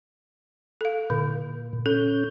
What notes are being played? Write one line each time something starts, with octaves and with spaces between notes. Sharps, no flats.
A4 F5
A#2 D3
C#4 A4 G6